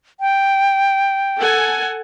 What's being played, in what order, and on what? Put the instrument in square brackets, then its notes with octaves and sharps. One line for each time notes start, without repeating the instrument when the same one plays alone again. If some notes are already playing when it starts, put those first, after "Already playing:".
[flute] G5
[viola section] A4 F#5 G#5